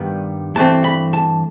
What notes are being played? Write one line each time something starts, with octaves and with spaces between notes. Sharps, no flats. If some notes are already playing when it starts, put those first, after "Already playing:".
Already playing: G2 D#3 G3 B3
G2 E3 A3 C4 A5
B5
A5